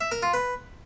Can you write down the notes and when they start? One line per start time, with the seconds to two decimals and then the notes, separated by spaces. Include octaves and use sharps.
0.01 E5
0.12 A#4
0.23 F4
0.34 B4